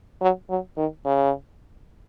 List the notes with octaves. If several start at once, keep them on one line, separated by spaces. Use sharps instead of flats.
F#3
F#3
D#3
C#3